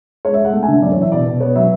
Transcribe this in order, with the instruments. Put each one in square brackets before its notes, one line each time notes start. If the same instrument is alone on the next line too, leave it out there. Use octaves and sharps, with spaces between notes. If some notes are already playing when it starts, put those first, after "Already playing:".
[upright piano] G#3 C#5
E5
G#3
F#5
A3
G#5
D3 E5
F#2 D5
C#5
E3 E5
B2 D5
B2
B3 C#5
F#3 E5